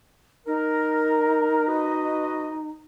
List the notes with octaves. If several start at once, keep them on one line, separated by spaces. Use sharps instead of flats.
D#4 A#4
F#4 B4 D#5